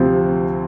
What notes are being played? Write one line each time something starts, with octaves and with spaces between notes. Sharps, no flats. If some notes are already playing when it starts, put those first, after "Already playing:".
Already playing: D2 C3 F3 C4 G4